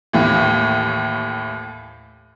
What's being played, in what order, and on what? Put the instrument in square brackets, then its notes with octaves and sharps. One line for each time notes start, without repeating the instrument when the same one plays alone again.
[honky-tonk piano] D#2 A2 E3